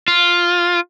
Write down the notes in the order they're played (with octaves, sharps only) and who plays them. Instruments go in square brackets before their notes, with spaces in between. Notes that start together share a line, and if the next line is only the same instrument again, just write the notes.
[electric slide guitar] F4